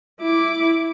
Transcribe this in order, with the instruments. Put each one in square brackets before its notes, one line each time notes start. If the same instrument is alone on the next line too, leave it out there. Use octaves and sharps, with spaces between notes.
[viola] E4 D6